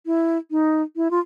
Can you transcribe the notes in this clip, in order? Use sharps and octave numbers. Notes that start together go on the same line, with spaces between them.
E4
D#4
E4
F4